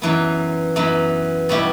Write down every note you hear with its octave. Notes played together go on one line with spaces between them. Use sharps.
F#2 E3 B3
F#2 E3 B3
B2 G3 B3 E4 G4